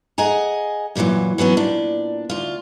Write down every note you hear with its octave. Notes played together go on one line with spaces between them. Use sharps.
G#4 D#5 F#5 G#5 A#5
F#2 A#2 C#3 E3 F#3
E3 F#3 B3 C#4
A#2 D4
D2 F4